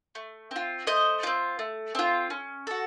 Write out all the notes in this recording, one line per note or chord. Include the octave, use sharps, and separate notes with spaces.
A3
C4 F4
A3 C5 D#5
C4 F4
A3
C4 F4
C#4
F#4 A4